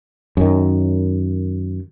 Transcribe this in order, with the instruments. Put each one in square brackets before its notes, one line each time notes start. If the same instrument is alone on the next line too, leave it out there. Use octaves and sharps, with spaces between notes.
[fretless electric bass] F#2 D#3